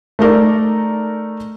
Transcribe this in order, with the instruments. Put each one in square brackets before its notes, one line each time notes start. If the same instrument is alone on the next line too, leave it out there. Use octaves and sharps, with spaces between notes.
[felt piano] A3 D#4 A#4 D5